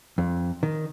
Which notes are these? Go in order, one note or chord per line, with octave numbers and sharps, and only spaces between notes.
F2
D#3